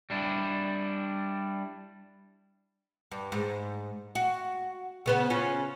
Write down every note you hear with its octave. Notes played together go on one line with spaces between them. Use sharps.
G3 D4 E4
G2
G#2
F#4
C#3 B3 C5
C#3 C#4 F4